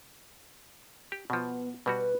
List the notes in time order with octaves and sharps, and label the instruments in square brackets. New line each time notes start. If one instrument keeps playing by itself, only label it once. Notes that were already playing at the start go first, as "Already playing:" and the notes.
[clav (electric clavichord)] G4
[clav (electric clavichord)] B2 F3 [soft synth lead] B3
[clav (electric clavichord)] B2 G3 F#4 [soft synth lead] B4